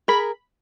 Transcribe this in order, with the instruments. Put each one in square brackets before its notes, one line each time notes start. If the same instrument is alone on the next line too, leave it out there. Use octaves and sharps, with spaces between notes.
[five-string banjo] G#4 A#4 [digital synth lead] B5